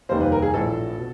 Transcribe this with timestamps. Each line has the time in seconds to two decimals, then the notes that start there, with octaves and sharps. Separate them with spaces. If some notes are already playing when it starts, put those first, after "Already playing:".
0.09 F1 D#2 D#3 G3 A#3 C5
0.21 B4
0.32 A#4
0.42 G#4
0.54 A#1 A2 E3 A4
0.98 B2